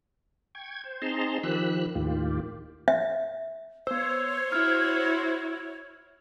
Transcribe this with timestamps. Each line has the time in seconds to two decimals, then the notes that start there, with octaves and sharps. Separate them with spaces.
0.55 G5 C#6 G#6
0.84 C5
1.02 C4 D#4 G#4 A5 A#5 C6
1.43 D#3 F3 G4 B5 E6 F#6
1.95 D#2 A2 D#3 F4 G4
2.88 E5
3.87 B3 C5 C#5 E6
4.52 E4 F#4 F6 G#6